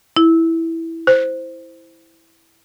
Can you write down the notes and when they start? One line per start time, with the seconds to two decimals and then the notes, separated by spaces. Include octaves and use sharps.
0.17 E4
1.07 C5